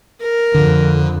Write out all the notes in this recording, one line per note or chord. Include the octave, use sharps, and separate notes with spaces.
A#4
F2 D3